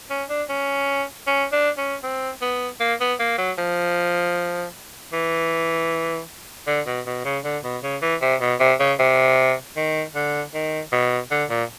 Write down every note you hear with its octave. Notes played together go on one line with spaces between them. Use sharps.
C#4
D4
C#4
C#4
D4
C#4
C4
B3
A#3
B3
A#3
F#3
F3
E3
D3
B2
B2
C#3
D3
B2
C#3
E3
C3
B2
C3
C#3
C3
D#3
D3
D#3
B2
D3
A#2